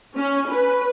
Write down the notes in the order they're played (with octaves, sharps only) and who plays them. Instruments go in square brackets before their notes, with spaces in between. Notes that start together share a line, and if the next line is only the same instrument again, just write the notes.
[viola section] C#4
B4